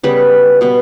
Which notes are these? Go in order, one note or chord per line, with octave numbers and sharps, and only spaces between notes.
C#3 G3 B3 B4
B2 G3 B3